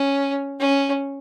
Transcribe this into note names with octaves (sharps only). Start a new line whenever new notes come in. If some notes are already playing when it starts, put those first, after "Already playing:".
Already playing: C#4
C#4